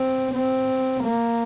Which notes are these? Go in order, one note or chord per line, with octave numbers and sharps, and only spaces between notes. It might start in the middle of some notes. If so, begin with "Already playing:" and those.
Already playing: C4
C4
A#3